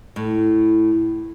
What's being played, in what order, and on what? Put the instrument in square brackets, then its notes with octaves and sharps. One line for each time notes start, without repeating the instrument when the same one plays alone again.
[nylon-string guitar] A2